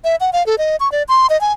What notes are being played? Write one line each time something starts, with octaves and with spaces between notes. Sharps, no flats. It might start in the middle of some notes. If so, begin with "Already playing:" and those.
E5
F#5
F5
A4
D#5
C#6
D5
C6
D#5
G#5